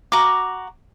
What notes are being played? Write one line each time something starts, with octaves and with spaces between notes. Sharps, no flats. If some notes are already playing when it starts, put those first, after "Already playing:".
F#4 A#5 D6